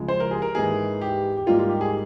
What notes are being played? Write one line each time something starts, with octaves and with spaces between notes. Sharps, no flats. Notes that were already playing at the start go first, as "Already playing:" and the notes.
Already playing: C#2 C#3 F3 G#3
C5
A#4
G#4
A#4
G#2 E3 A#3 G#4
G4
G4
G#2 G3 A#3 F4
F4
G4
G#4